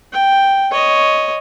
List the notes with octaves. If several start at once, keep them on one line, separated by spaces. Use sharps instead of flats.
G5
C#5 D#5